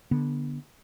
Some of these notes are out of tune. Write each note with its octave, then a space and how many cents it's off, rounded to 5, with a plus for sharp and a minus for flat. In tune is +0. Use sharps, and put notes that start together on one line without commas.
D3 +0 B3 -20